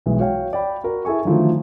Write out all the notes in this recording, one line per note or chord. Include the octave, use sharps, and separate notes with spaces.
B1 E3 G#3
F#4 C#5 F5 G5
D5 G5 B5
F#4 A#4
E4 G#4 A4 G#5 C#6
D3 D#3 F3 F#3 A3